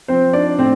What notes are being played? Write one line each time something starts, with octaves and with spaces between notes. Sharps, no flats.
F3 C4 C5
D4 D#4 D5
A2 C4 C5